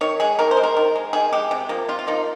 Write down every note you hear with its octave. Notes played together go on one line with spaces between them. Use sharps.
D#3 C#5
G#3 G#4
D#3 A#4
C5
G#3
A#4
D#3
G#3
D#3 G#4
G#3 G4
C3
F3 A#3
C3 F4
F4
F3 A#3 D#4